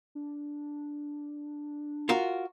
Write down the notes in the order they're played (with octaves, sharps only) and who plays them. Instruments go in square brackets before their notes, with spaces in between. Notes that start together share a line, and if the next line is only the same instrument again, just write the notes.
[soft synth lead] D4
[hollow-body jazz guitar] F4 F#4 A#4